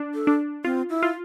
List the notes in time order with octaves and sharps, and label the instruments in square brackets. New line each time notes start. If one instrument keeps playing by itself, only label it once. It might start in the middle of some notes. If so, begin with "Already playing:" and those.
Already playing: [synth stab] D4
[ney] A4
[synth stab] D4
[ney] C4 [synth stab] F4
[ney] E4
[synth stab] F4